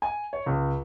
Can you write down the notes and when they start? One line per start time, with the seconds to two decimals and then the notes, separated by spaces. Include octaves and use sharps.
0.02 G#5
0.33 C#5
0.46 C#2